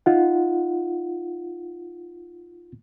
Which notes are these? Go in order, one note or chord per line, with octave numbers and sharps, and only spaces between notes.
D#4 F4 F#5